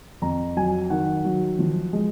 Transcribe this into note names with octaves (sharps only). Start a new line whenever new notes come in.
F2 A#5
F#3 G#5
D#3 F#5
F#3
F3
G#3